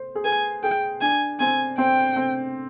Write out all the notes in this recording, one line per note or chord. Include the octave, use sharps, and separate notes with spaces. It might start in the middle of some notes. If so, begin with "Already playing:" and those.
Already playing: C5
G#4
B4 G#5
G#4 G5
D4 G#5
C4 G#5
C4 G5
C4